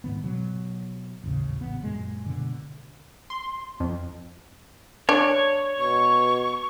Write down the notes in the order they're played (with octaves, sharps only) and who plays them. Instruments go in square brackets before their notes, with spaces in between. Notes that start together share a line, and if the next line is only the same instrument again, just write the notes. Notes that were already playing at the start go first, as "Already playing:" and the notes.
[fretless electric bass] G#2 D#3 B3
B2 F#3
D#1 A1 C#3
A1 B3
F#2 A#2 G#3
B2 D3
[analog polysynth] C6
F2
[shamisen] D4 [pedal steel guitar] C#5
[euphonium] B2 [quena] C#6